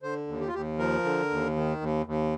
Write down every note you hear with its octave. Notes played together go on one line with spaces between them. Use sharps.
D3 C5
D#2
G4
F4
D#2 G4
F3 A#4
D3
D#2
D#3
D#2
D#2